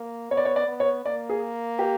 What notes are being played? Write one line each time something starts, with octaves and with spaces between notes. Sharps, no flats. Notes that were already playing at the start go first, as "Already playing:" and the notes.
Already playing: A#3
B3 C#5
D5
C#5
D5
B3
C#5
A#3 D5
G#4
G4